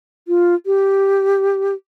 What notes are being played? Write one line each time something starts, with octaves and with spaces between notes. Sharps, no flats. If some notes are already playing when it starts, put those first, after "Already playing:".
F4
G4